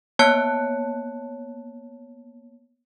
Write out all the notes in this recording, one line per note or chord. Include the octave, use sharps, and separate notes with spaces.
A#3 B3 C#5 A5 F#6 C#7